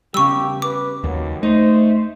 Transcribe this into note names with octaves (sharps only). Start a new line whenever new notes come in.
C#3 G3 G4 C#6 E6
B4 D6
D#2 F#3
A3 D#4 C5